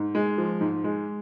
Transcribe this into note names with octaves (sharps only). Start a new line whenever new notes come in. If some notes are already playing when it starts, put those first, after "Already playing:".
Already playing: G#2
G#3
F3
G#2
G#3